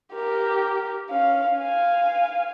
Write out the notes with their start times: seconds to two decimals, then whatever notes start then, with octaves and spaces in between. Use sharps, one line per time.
0.13 G4 A#4
1.10 C#4 F5
1.58 F5 G#5